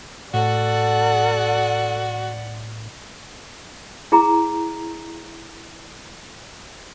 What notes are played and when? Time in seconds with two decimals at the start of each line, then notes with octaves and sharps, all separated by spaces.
0.34 A2 F#4 A4 D5 F#5
4.12 E4 G#4 A#5